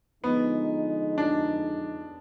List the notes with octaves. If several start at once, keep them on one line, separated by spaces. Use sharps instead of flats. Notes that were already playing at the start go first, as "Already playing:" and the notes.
D3 F3 G#3 B3 D#4
D4